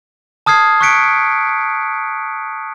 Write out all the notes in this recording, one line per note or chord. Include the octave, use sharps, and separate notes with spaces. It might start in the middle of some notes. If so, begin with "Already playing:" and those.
A5 D#6 F6 G#6 C7
C#6 D#6 F#6 B6 C#7 D7